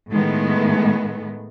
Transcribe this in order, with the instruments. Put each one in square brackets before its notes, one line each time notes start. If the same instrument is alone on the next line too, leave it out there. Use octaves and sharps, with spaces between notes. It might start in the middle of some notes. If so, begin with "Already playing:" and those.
[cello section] A2 D#3 G#3 A3 B3